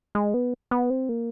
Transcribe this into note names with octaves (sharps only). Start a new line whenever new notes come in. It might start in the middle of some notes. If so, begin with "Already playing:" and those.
G#3
B3
B3
C4
A#3